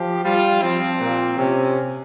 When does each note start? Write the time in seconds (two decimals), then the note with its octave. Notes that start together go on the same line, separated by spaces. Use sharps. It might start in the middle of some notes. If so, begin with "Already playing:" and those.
Already playing: F3 G4
0.24 G3 F4
0.62 F3 C4
1.01 A#2
1.38 C3 C#4